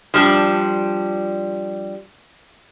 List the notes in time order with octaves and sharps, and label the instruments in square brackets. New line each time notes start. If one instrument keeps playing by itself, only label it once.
[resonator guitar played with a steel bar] F3 G3 D4